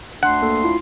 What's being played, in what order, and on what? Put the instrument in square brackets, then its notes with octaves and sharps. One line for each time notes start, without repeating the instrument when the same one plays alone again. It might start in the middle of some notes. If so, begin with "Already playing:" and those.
[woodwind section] D2 D4 C6 [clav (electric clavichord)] F#5
[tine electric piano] A#3 A4
E4 F4